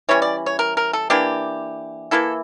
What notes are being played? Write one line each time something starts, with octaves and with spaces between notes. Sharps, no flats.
E3 G3 C#4 C#5
D5
C#5
A#4
A#4
A4
E3 A#3 D4 G4
E3 A#3 E4 A4